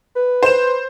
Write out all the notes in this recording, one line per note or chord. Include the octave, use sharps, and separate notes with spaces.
B4
C5 E7